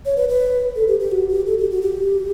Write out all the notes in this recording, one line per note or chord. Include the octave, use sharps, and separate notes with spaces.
C#5
B4
B4
A4
G4
G4
F#4
G4
A4
G4
F#4
G4